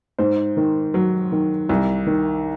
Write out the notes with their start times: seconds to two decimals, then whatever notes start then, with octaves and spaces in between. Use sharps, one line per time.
0.19 G#2 C5
0.57 D#3
0.94 F#3
1.32 D#3
1.69 C2
2.06 D#3